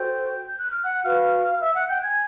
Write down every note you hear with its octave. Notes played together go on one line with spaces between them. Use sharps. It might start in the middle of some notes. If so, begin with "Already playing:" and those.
Already playing: F#4 A4 C5 G5 G6
G6
F#6
F6
F#5 F#6
F#4 B4 F5 F6
E5 E6
F#5 F#6
G5 G6
G#5 G#6